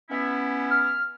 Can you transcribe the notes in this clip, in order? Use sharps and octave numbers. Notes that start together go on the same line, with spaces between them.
B3 C#4 E4
F6